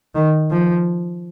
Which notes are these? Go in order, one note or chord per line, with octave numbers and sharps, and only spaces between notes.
D#3
F3